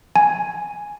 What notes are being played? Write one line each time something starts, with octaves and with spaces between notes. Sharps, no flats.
G#5